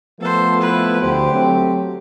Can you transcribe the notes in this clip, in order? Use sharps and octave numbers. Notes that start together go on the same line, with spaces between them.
F3 A3 B3 A4 C5
E4 B4
D2 G4 C5
F#3 A3 C4